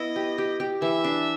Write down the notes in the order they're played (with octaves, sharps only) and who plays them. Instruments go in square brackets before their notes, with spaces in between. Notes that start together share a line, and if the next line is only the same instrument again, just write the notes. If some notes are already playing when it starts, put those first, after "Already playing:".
Already playing: [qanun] B3 E4 [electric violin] D#5
[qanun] G4
G4
G4
[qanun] E3 [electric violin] E5
[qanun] D4